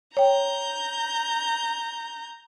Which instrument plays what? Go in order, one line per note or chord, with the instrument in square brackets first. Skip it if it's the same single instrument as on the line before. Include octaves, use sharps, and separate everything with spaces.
[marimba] C#5 G5 [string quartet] A#5 G6